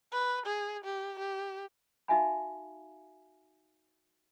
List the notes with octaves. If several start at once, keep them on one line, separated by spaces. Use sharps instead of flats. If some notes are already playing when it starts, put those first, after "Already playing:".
B4
G#4
G4
G4
D#4 F#4 E5 F5 G#5 B5